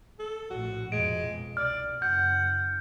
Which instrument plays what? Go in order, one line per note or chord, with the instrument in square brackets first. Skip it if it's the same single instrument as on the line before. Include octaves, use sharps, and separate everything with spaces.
[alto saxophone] A4
[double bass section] A#1 A2 [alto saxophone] F#4
[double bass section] F2 B2 [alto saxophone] G#3 [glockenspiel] D7
[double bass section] C2 [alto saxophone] D5 [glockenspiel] F6
[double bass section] F#1 [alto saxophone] F#5 [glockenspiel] G6